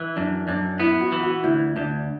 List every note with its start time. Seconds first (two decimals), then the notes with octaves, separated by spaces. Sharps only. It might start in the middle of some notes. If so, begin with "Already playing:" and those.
Already playing: E3
0.16 F#2 D4
0.48 F#2 D4
0.80 B3 E4
1.01 F#4
1.12 E3
1.23 F#4
1.44 D2 E4
1.76 D2 D4